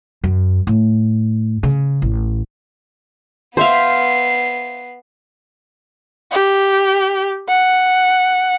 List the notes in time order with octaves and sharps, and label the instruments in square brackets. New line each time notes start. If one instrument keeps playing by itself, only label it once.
[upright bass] F#2
A2
C#3
A1
[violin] B3 C7 [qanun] C5 E5 F5
[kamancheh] G4
F#5